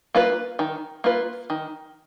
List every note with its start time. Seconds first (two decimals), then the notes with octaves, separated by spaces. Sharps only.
0.15 A#3 F4 B4
0.59 D#3
1.04 A#3 F4 B4
1.50 D#3